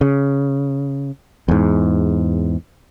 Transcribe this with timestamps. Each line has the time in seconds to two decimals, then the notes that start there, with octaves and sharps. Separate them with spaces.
0.01 C#3
1.48 E2 G#2